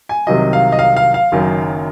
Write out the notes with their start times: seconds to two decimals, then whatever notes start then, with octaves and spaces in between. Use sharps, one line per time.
0.09 G#5
0.27 C2 C3 D#3 F#3 D#5
0.53 F5
0.72 D#5
0.79 F5
0.97 F5
1.14 F5
1.32 F#1 F#2 D#3